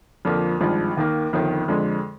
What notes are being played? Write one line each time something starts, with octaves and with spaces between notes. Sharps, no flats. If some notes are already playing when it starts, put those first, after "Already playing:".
F2 D3 F3 A#3
G#1 G2 F3 G#3
D#2 D#3 A#3
G1 F2 D#3
F2 D3 G#3